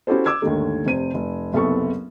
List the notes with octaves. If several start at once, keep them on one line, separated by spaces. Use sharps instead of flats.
C#4 E4 F#4 G4 A4 C5
D6 E6 G#6
D#2 G#2 D3 D#3 A3
F1 C3 C5 D#7
F1
F#1 C2 B3 C4 A4 C#6